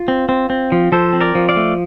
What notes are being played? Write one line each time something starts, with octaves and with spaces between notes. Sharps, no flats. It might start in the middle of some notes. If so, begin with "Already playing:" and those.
Already playing: F4
C4
C4
C4
F3
F3 A4 C5
C4
A#4 D5
F3
D5 F5
A3